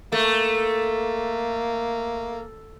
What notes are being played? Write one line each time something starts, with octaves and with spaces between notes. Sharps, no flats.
A3 A#3